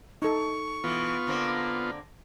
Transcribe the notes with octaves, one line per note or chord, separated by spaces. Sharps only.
D#4 A4 C#6
B2 E3 B3 F4
D3 A#3 C4